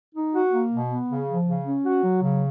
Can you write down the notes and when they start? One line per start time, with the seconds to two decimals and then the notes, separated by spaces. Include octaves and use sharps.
0.15 D#4
0.34 F#4
0.53 A#3
0.71 B2
0.91 B3
1.09 C#3
1.28 F3
1.47 C#3
1.66 C#4
1.85 F#4
2.03 F#3
2.22 C#3